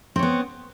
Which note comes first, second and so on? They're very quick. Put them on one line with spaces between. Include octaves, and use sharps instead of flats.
C4 C#5 B3